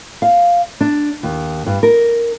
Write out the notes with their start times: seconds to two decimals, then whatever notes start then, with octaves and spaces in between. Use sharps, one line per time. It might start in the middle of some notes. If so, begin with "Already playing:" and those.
0.22 F5
0.81 D4
1.23 D#2
1.66 G2
1.83 A#4